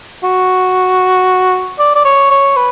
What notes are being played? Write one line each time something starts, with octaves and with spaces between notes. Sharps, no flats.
F#4
D5
D5
C#5
C#5
B4